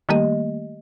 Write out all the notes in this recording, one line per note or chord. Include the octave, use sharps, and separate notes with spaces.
D#3 G3 A3 A#3 G4 D#5